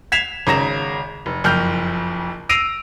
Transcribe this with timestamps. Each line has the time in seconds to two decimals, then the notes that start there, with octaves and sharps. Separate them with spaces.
0.12 G#6 B6 C7 E7 F7
0.47 G#1 C#3 A#5 A#6 E7
1.26 F1
1.44 F#1 F2 F6 G6
2.49 E6 A#6 C7 D7 D#7 F7